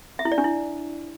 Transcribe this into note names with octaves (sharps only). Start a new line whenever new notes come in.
E5
E4
D5
D4
E4